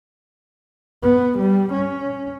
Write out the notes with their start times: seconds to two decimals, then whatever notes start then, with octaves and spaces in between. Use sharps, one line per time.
1.03 B3
1.38 G3
1.73 C#4